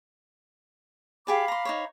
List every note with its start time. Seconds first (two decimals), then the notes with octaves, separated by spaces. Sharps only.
1.27 G4 G#4 D5 F5 B5 D6
1.48 A#5 C6
1.65 D#4 C5 C#5